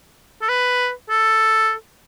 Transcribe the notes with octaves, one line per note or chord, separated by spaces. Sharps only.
A4
B4
A4